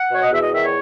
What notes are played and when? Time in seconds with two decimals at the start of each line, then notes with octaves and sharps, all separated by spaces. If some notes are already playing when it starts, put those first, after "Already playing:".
Already playing: F#5
0.10 B2 C#5
0.23 D#5
0.31 E2 E5
0.42 D#5
0.53 D#3 E5
0.64 C#5